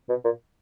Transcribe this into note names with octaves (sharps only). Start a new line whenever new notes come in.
B2
A#2